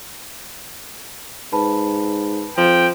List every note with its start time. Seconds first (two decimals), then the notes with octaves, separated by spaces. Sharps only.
1.52 G#2 B4 A5 B5
2.58 F2 F3 G5